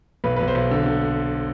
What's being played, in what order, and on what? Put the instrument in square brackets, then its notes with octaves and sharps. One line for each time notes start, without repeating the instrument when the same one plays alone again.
[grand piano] B1 B4
B1 B4
C5
B1
D3
D3